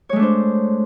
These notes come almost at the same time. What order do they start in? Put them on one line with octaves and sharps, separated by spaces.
C#5 G#3 A3 D4 C5